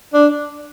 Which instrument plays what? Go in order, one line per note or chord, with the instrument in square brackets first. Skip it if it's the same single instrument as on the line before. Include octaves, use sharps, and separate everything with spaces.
[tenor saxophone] D4